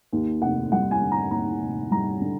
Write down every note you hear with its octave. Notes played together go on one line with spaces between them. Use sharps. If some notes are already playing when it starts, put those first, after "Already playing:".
D#2
F1 F#5
G3 F#5
G#5
D3
A#5
D#2 A#5
F1
G3 A#5
D3